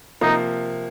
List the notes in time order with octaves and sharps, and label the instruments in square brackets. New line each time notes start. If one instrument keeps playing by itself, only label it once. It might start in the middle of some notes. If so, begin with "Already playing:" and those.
[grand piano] C3 F3 A#3 [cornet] D#4